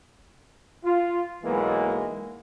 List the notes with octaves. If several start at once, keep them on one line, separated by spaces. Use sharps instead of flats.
F4
B1 E3 G#3 A#3 B3